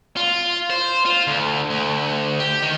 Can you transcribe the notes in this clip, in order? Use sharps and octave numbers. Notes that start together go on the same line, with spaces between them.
F4
C5
F4
D2
D2
G4
D#3